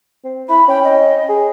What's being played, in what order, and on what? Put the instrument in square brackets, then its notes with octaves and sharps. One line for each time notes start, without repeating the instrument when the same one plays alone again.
[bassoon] C4
[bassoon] E4 [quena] B5
[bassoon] C#4 [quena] G5
[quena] D#5
[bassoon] G#4